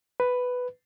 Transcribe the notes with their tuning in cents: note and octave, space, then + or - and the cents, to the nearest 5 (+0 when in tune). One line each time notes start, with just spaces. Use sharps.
B4 +5